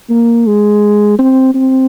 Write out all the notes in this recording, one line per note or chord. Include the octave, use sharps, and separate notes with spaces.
A#3
G#3
C4
C4